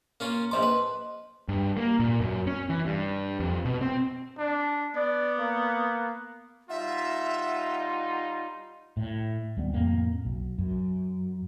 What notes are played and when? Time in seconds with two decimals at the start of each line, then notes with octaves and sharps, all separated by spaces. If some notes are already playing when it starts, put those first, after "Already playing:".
0.20 A#3 C#4 F4
0.51 A#1 F3 D#5 C6 D6
0.63 B4
1.48 G2
1.77 A#3
2.00 A#2
2.20 F#2
2.47 C#4
2.69 E3
2.86 G2
3.40 F2
3.65 B2
3.81 C4
4.38 D4
4.95 B3 D5
5.39 A#3
6.70 G3 D#4 F4 E5 F#5
8.97 A2
9.57 D#2 G3 B3
9.74 F2 A2 A#3 C4
10.25 B1
10.58 F#2